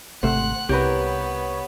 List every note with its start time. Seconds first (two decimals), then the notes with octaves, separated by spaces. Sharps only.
0.23 G#1 C3 A3 C5 F#5 F#6
0.69 C2 B3 G4 A#4 B4 C#5